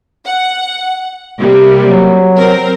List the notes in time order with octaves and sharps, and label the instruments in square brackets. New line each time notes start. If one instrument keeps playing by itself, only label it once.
[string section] F#5
C3 G3 A#3
[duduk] F#3
[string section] C4 A#4